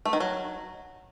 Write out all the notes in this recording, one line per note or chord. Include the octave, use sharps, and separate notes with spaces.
A3
D#3
F#3